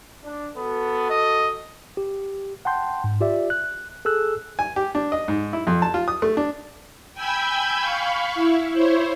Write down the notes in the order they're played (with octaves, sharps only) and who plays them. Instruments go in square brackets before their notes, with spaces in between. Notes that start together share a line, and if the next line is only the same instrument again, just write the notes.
[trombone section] D4
[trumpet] B3 [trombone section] F#4 A4
[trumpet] D#5
[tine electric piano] G4
F#5 G5 A5 C6 G6
G#2
F4 G4 D5 E5
F#6
G#4 A4 E6 F#6
[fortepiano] G#5
G4
D4
D#5
G#2
E4
F2
A5
F4
D#6
A3
D4
[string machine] G5 G#5 B5 E6 G6 G#6
F5 B5 C#6
E4
E4 C5 C#5